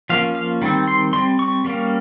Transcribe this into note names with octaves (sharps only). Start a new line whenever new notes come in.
F3 A#3 C#4 F5
F5
D#3 G3 C4
C6
G3 C4 C6
C#6
G3 A#3 C#4